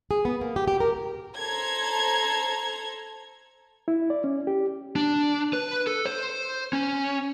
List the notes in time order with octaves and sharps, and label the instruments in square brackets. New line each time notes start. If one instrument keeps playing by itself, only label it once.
[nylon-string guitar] G#4
B3
A#3
G4
G4
A#4
[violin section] A4 C5 A5 A#5 G#6
[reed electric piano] E4
D5
C#4
G4
[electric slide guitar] D4
B4
A4
C5
C#4